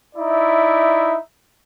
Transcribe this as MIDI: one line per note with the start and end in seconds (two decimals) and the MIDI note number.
0.16 1.16 63
0.16 1.16 64
0.16 1.16 74
0.16 1.16 76